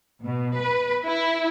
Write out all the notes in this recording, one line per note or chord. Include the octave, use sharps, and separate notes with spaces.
B2
B4
E4